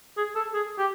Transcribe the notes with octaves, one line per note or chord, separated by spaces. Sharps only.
G#4
A4
G#4
G4